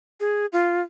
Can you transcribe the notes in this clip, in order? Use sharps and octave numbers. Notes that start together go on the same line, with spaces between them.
G#4
F4